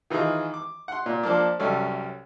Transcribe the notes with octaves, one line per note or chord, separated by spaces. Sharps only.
D#3 E3 D#4 F4 G#4
D6
F#5 C6
A#2
F3 A#3 D4
C2 F#2 G3 C#4 A4